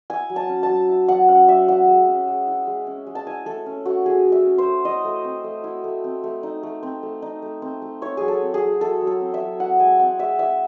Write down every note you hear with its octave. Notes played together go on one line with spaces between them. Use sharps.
E4 G#5
F#3
A5
C#4
A5
F#3
E4
F#3 F#5
C#4 F#5
F#3 E5
E4 F#5
G#3
C#4
G#3
E4
G#3
C#4
G#3
A5
E4 G#5
A3 A4
C#4
A3 F#4
E4 G#4
A3
E5
C#4
C5
A3
E4 D#5
A3
C4
A3
E4
A3
C4
A3
D#4
A3
C4
A3
D#4
A3
C4
A3
E4 C#5
F#3 G#4
A4
C4
G#4
F#3
E4 A4
F#3
A4
C4
E5
F#3
E4 F#5
G#3 G#5
C4 F#5
G#3 E5
E4 E5